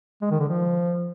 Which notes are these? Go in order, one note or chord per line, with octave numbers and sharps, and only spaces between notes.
G#3
D#3
D3
F3